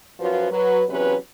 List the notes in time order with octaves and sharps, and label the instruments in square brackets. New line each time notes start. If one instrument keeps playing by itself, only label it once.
[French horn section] F#2 F3 F4 F#4 B4 C#5
F#3 B4
E2 C3 F#3 C#4 B4